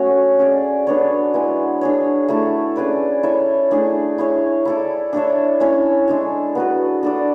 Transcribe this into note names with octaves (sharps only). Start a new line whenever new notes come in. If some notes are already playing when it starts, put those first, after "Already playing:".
Already playing: A3 C#4 F#4 C#5
C#4 G#4 D5
B3 D4 A4 C#5
G#3 B3 E4
D4 G#4 C#5
A3 E4 A4
C#4 G#4 B4 D5
E4 A4 C#5 E5
A3 D4 G#4
E4 G#4 C#5
E4 A4 D5
D4 A4 C#5 E5
C#4 E4 A4 C#5
G#3 D4 A4
B3 F#4 B4
D4 A4 D5